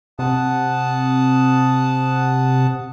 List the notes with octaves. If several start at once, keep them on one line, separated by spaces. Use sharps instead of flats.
C3 F#5 A5 D#6